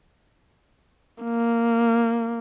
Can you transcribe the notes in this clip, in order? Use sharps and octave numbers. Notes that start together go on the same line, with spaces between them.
A#3